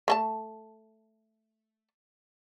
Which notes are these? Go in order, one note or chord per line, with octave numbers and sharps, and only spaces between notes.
A3 A4 A5